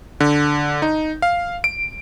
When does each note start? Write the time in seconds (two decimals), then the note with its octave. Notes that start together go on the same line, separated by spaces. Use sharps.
0.20 D3
0.82 D#4
1.22 F5
1.64 D7